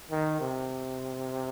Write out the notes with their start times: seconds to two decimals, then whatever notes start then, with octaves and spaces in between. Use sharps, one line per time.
0.11 D#3
0.41 C3